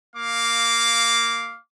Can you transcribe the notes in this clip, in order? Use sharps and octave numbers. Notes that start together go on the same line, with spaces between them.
A#3 F5 D6